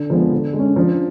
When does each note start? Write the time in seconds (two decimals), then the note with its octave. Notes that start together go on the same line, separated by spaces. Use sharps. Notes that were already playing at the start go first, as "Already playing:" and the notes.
Already playing: D3 D4
0.10 F3 G#3 B3
0.32 D3
0.53 G#3
0.59 C#4
0.76 F3 D4